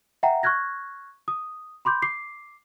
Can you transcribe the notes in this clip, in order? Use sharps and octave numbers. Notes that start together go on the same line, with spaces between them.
E5 F#5 G5 A#5
C#6 F6 F#6 G#6 A#6
D#6
B5 C6 D6 G6
D6 C7